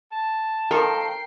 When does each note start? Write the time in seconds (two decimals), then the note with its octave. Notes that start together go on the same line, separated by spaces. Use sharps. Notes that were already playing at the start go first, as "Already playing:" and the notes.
0.12 A5
0.71 D#3 F3 A4 A#4 G5 C7